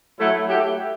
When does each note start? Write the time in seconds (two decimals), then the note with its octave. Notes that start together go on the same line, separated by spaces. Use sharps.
0.19 F#3 A3 E4
0.48 F#3 A3 E4 G4